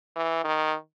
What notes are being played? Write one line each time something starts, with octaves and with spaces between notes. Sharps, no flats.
E3
D#3